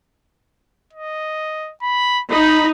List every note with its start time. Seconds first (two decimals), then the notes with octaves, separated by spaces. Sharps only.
0.93 D#5
1.82 B5
2.30 D#4 B5